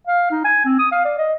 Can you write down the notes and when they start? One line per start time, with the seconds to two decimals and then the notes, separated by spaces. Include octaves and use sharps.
0.08 F5
0.31 D#4
0.45 G#5
0.65 C4
0.79 D#6
0.92 F5
1.05 D5
1.19 D#5